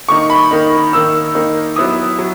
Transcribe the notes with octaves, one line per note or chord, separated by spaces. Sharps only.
D#3 A#3 D#4 C#6
B5
D#3 A#3 D#4
D#3 A#3 D#4 E6
D#3 A#3 D#4
F#3 B3 E4 D#6
F#3